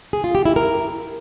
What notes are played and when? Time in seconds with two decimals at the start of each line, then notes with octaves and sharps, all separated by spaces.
0.13 G#4
0.24 F4
0.35 G4
0.45 E4
0.56 A#4